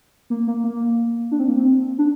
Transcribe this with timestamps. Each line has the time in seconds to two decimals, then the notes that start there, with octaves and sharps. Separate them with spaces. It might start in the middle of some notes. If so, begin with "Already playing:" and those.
0.30 A#3
0.47 A#3
0.64 A#3
1.32 D4
1.39 C4
1.48 A#3
1.57 C4
1.98 D4